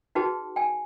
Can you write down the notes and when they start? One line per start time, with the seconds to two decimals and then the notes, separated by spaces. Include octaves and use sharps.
0.15 D#4 F#4 G#4 B4 G5 A5
0.56 G5 G#5